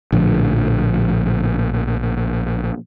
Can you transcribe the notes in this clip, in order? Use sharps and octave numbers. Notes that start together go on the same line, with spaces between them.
A#1 A2 D3 F3